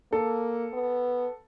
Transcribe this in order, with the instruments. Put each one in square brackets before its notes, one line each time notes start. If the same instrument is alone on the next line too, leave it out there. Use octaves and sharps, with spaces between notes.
[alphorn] A#3 [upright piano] A4
[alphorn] B3